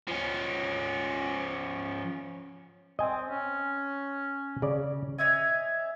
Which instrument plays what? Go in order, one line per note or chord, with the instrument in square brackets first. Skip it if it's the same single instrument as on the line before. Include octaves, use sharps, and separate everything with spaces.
[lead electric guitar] F3 C#4
[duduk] C4 [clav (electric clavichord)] D#5 G#5
[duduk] C#4
[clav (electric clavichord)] C#3 D5
[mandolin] C#5 D#5 E5 G#5